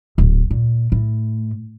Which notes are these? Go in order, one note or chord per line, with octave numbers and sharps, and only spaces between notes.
D1
A#2
A2